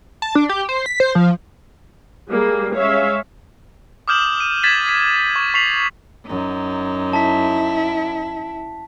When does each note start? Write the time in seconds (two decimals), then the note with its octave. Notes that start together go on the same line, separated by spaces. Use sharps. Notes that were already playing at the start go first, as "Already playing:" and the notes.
0.22 A5
0.35 D4
0.49 G4
0.69 C5
0.86 B6
1.00 C5
1.15 F3
2.28 G3 G#3 A#3 G#4
2.75 G#3 C#4 C#5 E5 F5
4.08 D6 D#6 F6 G6 E7 F#7
4.40 D#7
4.63 G#6 A6 B6 E7 F#7
4.89 B6
5.36 C#6
5.54 C#6 B6 C7 F7 F#7
6.27 F#2 D#4
7.13 E4 A5 B6